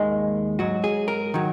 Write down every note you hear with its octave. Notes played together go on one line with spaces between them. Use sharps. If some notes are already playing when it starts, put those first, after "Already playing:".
Already playing: D#2 D#3 G#3
G#2 F#3 F#4
G#4
A#4
D#3 F#3